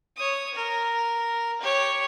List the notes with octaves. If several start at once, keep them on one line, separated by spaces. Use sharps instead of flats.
C#5 D#6
A#4
G4 C#5